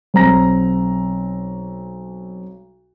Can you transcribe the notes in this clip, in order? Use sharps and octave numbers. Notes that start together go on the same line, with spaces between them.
B1 C4 A#5 A#6